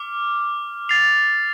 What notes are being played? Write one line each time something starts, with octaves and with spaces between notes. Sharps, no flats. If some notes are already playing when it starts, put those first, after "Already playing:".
Already playing: D6 F6
A6 C7 F7